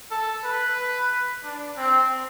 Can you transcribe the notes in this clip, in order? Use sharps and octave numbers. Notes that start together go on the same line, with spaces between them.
A4
B4
D4
C4